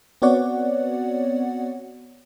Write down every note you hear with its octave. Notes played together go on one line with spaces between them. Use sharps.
B3 C4 F#4 C#5 D5 F#5